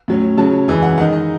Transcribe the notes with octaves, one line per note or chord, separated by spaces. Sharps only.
A2 F#3 C#4
C#3 F#3 C#4 A5
F#2 E3 G#3 C#4 E4 G#5
F#5
D#3 G#3 D#4 F#5
D#5